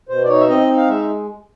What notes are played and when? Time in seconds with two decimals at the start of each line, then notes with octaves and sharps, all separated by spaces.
0.09 B2 C5
0.24 D5
0.29 D#4 C#5
0.40 E5
0.48 C4 D#5
0.67 D#4
0.77 F5
0.87 G#3 E5